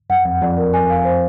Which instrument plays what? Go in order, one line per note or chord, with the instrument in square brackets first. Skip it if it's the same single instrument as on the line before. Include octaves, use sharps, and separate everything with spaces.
[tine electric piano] F#2 [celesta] F#5
[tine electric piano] F2 [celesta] F#5
[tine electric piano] F2 [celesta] D5
[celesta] A#4
G#5
F5
C5